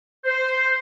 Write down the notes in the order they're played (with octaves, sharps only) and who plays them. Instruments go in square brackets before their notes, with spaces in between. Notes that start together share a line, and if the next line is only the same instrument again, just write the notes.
[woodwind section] C5